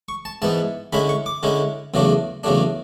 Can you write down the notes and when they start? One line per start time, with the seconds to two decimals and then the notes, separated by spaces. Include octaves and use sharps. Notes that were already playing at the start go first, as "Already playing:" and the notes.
0.08 C#6
0.25 A5
0.42 G#2 E3 B3 A5
0.93 D3 G#3 C#4 E4 B5
1.09 C#6
1.26 D6
1.43 D3 G#3 C#4 E4
1.94 E2 C#3 F#3 A3 D4
2.44 E2 C#3 F#3 A3 D4